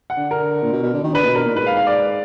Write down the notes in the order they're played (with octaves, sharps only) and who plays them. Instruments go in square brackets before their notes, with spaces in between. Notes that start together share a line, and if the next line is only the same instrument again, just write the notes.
[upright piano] F#5
[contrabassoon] D3
[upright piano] A#4
[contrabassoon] A#2
B2
B2
D3
D#3
[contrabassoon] D3 [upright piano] B4
[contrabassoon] A#2
B2
[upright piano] A#4
[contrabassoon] A#2
[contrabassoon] G#2 [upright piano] B4
[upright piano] F5
F5
D5